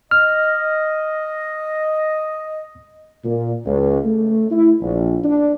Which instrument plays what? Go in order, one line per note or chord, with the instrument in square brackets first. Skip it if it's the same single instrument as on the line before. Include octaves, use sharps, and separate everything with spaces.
[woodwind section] D#5 [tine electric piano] F6
[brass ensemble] A#2
C#2
A3
E4
A#1
D4